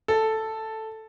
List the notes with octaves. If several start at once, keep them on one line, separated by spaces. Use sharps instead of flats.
A4